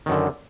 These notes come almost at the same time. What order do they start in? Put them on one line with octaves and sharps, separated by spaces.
D#3 F#2 D3